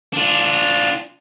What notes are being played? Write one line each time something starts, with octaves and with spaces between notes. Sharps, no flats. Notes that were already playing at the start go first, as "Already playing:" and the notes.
D4 F4